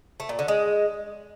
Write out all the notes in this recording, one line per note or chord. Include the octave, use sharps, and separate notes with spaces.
A3
A#2
D3
G#3